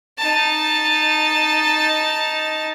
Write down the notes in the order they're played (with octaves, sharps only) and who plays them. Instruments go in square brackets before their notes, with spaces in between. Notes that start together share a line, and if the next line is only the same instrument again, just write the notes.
[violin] D#4 A5